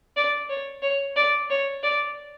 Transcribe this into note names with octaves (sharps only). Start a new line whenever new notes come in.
D5
C#5
C#5
D5
C#5
D5